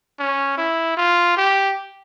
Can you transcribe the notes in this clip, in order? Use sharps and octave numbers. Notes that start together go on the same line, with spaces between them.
C#4
E4
F4
G4